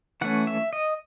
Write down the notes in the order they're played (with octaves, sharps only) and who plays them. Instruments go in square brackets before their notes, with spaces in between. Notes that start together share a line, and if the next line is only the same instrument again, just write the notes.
[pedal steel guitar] E3 A3 C#4 F#5
E5
D#5